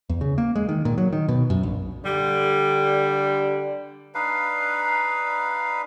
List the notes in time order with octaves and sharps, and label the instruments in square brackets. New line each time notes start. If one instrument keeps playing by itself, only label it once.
[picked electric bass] E2
C#3
A#3
G#3
D#3
A#2
F#3
D#3
B2
F#2
A#1
[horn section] D3 G3
[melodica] D4 D#4 B4 F5